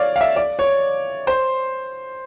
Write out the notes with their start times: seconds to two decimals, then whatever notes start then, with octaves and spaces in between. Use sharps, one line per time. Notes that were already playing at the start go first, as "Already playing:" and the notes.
Already playing: C#5 D5 F5
0.16 F5
0.21 E5
0.36 D5
0.59 C#5
1.27 C5